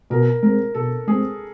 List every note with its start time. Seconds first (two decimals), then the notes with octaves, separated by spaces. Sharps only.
0.10 B2 A#4
0.43 G#3 C4 A#4
0.75 B2 A4
1.07 G#3 C4 G#4